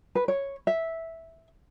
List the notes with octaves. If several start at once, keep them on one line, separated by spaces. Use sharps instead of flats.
B4
C#5
E5